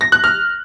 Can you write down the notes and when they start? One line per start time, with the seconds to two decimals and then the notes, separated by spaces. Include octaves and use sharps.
0.01 A#6
0.12 F#6
0.24 F6